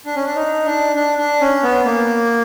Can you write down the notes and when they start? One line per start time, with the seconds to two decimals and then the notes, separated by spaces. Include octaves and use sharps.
0.05 D4
0.16 C#4
0.25 D4
0.36 D#4
0.66 D4
0.96 D4
1.18 D4
1.41 C#4
1.63 B3
1.85 A#3